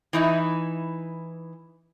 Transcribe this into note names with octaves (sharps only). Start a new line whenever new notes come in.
E3 D#4 E4